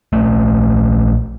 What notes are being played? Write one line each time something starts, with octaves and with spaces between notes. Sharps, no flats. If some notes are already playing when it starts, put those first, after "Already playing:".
A#1 A3